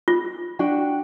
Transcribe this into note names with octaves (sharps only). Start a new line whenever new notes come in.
F4
D4 F#4 G5